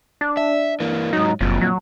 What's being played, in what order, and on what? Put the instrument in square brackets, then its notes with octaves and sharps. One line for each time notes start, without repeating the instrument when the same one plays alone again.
[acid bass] D4
[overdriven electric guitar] E5
E3 A#3
[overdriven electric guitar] G#2 F#3 [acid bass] D#4
[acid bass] F#1 [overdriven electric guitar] F2 A#2
[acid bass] F#3